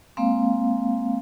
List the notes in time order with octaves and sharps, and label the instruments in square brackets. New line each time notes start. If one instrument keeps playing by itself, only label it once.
[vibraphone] G#3 A#3 C4 F5